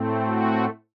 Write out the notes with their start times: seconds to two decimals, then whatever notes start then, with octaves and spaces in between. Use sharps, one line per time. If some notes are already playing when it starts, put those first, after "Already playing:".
Already playing: A2 A3 C4
0.26 F#4